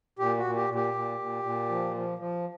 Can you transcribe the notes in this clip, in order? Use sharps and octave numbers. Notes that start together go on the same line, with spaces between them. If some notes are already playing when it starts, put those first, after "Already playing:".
A#2 G4
F#4
A#2
G4
A#2
G4
A#2
A#2
A#2
F3
F3
F3